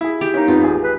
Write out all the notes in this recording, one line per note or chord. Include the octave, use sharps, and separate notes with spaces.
E4 G#4
G4
A#3 C#4 D#4
F2 B3 C4 F4
A1 G#4
B4